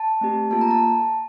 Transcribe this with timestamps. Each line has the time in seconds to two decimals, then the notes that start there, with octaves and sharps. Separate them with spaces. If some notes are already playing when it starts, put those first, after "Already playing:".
Already playing: A5
0.21 A3 C4 G4
0.51 A#3 F4 A4 A5
0.61 A#5
0.71 A5